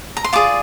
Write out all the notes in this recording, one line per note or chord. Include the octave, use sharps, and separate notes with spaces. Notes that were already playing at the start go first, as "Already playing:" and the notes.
A#5
C6
F4 G#4 D5 D6